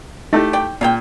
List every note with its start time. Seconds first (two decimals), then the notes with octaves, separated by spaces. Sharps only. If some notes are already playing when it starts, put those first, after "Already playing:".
0.33 A3 D#4 E4 G4 A4
0.53 D5 G5
0.81 A#2 G#4 F5 G5